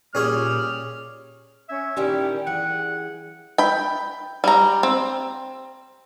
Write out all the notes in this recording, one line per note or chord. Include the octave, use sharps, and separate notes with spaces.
A#2 G3 C#4 G#4 C#5 F6
C#4 E5 G#6
A#2 D#3 G3 A#3 C#4 E4 G4 G5
E3 G#4 F#5
G5 B5
G3 A#5
C4